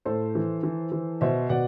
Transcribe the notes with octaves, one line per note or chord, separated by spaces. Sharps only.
A2 A4 C5
E3
E3
E3
B2 C5 E5
B2 D5 F#5